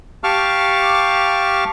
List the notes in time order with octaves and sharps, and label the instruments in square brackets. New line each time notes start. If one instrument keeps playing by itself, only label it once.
[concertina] G4 F5 A5 C#6 D6 F6